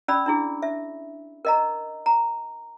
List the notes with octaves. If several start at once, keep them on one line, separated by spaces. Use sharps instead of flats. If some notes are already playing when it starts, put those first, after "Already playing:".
C#4 D5 B5 E6
D4 E4 G#4
E5
A#4 D#5 A#5
A#5